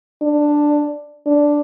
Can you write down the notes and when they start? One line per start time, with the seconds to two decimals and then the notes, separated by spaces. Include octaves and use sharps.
0.22 D4
1.27 D4